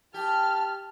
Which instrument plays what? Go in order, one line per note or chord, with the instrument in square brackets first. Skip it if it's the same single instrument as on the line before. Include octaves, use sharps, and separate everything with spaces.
[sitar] G4 [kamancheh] A5 F6